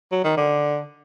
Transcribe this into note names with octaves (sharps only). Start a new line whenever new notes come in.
F#3
D#3
D3